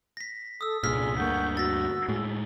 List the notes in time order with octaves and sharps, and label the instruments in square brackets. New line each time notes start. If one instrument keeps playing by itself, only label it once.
[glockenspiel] A#6 B6
[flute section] A4 [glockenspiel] D#6 E6
[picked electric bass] C2 G2 A#2 [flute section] G#4 C6 [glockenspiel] E6 F6 B6
[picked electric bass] D2 G2 A#3 [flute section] F#5 C#6 G6
[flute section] F#4 E6 [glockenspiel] A6 A#6
[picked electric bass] A2 G#3